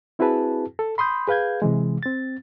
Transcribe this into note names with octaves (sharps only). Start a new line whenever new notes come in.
C4 E4 F#4 G#4 B4 A5
A4
B5 C6 D#6 G6
G#4 B4 F5 G6 G#6
C3 E3 G#3
C4 A6